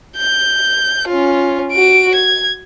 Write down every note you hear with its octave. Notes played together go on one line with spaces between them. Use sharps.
G6
C#4 F4
F#4 D7
G#6